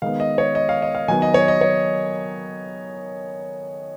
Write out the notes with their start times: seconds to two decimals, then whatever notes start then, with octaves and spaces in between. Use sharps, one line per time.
0.02 D#3 G#3 B3 F5
0.20 D#5
0.38 C#5
0.55 D#5
0.69 F5
0.82 D#5
0.95 F5
1.08 D#3 F#3 B3 G#5
1.22 D#5
1.34 C#5
1.48 D#5
1.61 C#5